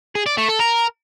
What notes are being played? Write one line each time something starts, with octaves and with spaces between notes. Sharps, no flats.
G#4
D5
A3
A4
A#4